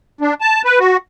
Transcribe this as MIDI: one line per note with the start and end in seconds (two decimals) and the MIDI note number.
0.21 0.34 62
0.41 0.62 81
0.64 0.79 71
0.80 0.97 66